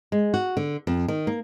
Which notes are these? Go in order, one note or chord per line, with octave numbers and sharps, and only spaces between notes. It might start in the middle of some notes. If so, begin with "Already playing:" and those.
G#3
F#4
D3
F2
D#3
A#3